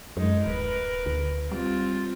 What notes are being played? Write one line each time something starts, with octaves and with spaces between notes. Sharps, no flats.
F#2 G#3 D#4
D1 A#4 B4
D2
G3 C4 F4